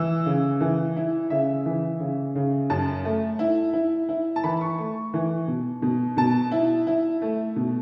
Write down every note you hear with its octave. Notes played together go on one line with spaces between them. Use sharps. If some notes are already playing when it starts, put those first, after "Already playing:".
Already playing: E3 E6
C#3
E3
E4
C#3 E5
E3
C#3
C#3
F#2 A5
A3
E4
E4
E4
A5
E3 B5
C#6
A3
E3
B2
B2
B2 A5
E4
E4
A3
B2